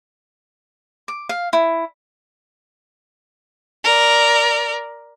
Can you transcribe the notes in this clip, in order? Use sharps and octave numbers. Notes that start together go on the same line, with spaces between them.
D6
F5
E4
A#4 D5